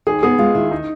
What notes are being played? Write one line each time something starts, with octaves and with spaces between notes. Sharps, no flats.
D#2 G#4
B3 G#4
G#3 F4
D#3 E4
D#4